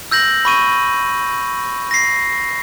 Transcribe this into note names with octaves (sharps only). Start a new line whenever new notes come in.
E6 G6 A#6 F#7
B5 C#6 D#7
A#6 C7